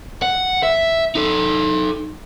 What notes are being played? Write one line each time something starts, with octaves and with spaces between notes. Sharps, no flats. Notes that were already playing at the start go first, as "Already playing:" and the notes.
F#5
E5
D#4 A4